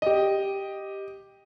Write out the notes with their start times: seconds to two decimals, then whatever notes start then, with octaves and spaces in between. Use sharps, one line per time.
0.02 G4 D#5